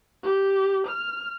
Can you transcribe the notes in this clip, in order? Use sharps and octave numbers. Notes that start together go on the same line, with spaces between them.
G4
F6